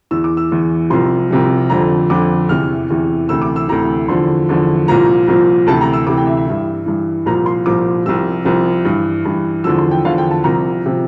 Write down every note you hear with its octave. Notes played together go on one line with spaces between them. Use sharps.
E2 E3 E6
D6
E6
E2 E3
C2 C3 F3 C6
C2 C3 F3
F2 D3 F3 A#5
F2 D3 F3 D6
E2 C3 E3 F6
E2 C3 E3
D2 C3 E3 E6
D6
E6
D2 C3 E3 A#5
E2 D3 F3 C6
E2 D3 F3
C2 A#2 F3 A#5
C2 A#2 F3
D2 C3 E3 A5
A#5
E6
D2 C3 E3 D6
G5
E5
E5
G2 E3
G2 E3
C2 A#2 F3 A#5
C6
C2 A#2 F3 D6
C2 C3 F3 E6
C2 C3 F3
G2 E3
G2 E3
E2 D3 F3 E6
C6
G5
E2 D3 F3 F5
G5
A5
C2 C3 F3 A#5
C3 F3